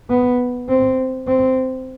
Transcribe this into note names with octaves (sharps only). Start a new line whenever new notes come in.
B3
C4
C4